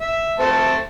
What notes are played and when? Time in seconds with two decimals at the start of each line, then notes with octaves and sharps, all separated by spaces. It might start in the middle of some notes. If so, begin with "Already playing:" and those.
0.01 E5
0.39 A3 C4 A5